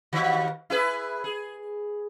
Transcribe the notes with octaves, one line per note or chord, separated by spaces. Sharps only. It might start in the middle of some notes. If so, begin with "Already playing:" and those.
D#2 D#3 F#4
E4 G#4 B4
G#4